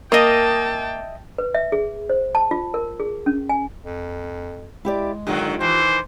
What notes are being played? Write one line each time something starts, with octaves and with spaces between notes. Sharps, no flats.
A#3 D#5 E5 G5 A5 D#6
B4
E5
G#4
C5
A5
F4
A#4
G#4
C#4
G#5
F2
G#3 E4 G4 D5
D3 D#3 F#3 F4 G4
D#3 E3 C5